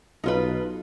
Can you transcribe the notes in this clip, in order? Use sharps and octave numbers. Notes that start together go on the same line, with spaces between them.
B1 D#4 F4 B4